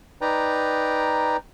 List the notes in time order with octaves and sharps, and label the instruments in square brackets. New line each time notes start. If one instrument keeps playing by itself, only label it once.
[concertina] D#4 B4 D5 G5 A#5